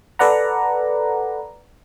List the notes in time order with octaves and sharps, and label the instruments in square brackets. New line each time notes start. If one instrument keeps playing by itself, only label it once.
[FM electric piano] A4 B4 D5 F#5 A#5